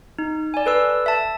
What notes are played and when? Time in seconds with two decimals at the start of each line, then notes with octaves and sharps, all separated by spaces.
0.19 D#4
0.54 D5 G#5
0.66 A4 B4 E6
1.06 E5 A5